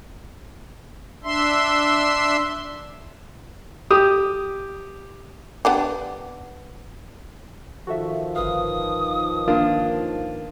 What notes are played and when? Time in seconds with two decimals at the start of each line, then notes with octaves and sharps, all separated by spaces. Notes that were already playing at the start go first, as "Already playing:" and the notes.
1.24 D4 E5 C6
3.90 G4 D#6
5.65 B3 D4 G4
7.87 D#3 F3 F#4 A4 E5
8.36 G1 B4 F5 D#6
9.48 A#3 D4 F4